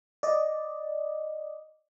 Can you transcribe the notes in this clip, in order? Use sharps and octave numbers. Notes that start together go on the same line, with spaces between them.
D5 D#5